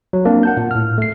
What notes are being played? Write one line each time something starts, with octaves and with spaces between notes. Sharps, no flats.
F#3
A#3 C4 D4
F#5 A5 G6
A#2
A2 F6
A3 C7